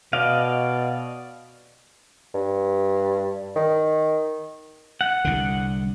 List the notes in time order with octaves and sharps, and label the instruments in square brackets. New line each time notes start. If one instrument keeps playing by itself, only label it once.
[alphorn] B2 [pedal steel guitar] D5 D#5 F5
[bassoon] G2
D#3
[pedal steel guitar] F#5
[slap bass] C2 D3